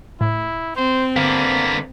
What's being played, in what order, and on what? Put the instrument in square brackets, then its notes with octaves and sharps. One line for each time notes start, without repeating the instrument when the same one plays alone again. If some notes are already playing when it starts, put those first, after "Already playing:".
[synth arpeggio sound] A2 [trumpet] E4
[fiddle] C4 [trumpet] C5
[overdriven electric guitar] D3 B3 [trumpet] A#3 [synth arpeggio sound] F5